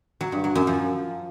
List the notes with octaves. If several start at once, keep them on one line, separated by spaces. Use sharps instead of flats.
F#3
G2
F#3
F#2
F3